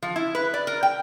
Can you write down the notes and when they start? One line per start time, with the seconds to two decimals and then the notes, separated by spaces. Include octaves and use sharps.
0.02 F3
0.16 E4
0.35 B4
0.54 D5
0.67 A#4
0.83 G5